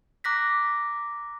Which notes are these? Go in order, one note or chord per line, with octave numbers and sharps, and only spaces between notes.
A#5 D6 F#6 A#6 B6